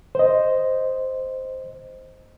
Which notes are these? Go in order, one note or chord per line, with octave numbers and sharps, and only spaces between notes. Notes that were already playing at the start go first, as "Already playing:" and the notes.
C5 D#5